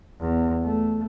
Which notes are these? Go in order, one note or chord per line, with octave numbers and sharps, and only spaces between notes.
E2
A3